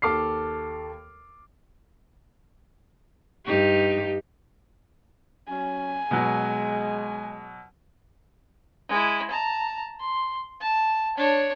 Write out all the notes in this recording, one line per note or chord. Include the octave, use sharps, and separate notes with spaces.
D#2 A4 D6 F6 C7
G2 D#4 G4
F#3 C#4 G#5
B2 F#3 G#3
G#3 E4
A5 A#5
C6
A5
D4 C#5